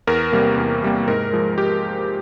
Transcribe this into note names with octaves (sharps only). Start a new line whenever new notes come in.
E2 A#4
C3 G3 A#3
E2
C3 G3 A#3
G#2 A#4
F3 G#3
G4